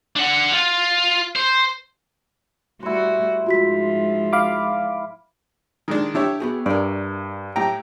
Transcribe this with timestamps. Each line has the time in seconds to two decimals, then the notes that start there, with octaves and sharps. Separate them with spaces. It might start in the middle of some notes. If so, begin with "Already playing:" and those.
0.16 D4 F#5
0.52 F4
1.36 C5
2.83 G3 A3 E4 F#4 C5
3.46 G#2 F3 F4 F#4 B6
4.33 F5 B5 D6
5.88 D#3 G#3 D4
6.15 D4 E4 G4 C#5 E5
6.40 B3 F#4 G#4
6.66 G2 A#4 D5
7.56 A2 G4 G5 A#5